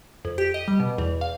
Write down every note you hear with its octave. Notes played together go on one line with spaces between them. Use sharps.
F2
G4
D#5
G3
B2
E2
F5